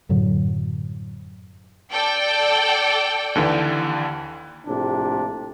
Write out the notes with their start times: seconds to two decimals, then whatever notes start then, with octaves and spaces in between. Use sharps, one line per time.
0.09 F#2 A2 D3 F#3
1.92 A4 D5 G5
3.35 D#2 D3 E3
4.67 A#1 A2 C3 D4